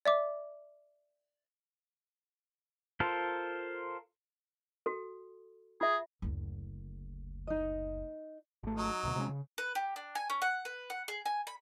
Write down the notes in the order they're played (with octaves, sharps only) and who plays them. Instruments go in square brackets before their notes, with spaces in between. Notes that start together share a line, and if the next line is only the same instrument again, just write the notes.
[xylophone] D5 E5 D6
[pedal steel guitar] F4 A4 A#4 C5
[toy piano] F#4 A4
[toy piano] F4 E5 [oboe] G#4
[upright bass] F#1 D2
[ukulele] D#4 D#5
[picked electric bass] G#1 A3
[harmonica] F#3 D#4
[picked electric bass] A1 D2 B2
C3 G#3 C#4
C#3
[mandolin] B4
G4
D4
G#5
C#4
F#5
B4
F#5
G#4
G#5
B5